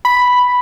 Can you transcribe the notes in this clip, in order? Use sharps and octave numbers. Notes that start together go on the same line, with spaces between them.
B5